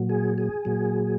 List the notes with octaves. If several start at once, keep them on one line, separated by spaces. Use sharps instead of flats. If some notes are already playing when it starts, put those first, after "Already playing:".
Already playing: A#2 F#3
G#4
G#4
A#2 F#3